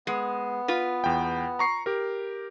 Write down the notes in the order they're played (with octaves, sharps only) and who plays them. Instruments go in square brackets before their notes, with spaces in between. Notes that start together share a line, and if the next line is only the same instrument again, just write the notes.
[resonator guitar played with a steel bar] G#3 [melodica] B3
[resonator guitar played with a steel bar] F4 B4
[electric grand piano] E2 G5
A#5 C#6 C7
G4 A#4